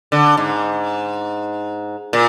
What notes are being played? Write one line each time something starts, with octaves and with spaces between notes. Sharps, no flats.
D3
G#2
A#2